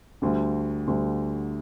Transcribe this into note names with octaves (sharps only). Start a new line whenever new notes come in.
D2 D3 G3
D2 D3 G3